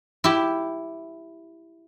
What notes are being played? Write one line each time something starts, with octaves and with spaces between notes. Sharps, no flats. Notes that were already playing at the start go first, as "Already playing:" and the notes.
E4 G4